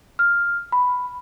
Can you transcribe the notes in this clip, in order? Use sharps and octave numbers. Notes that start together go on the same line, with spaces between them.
F6
B5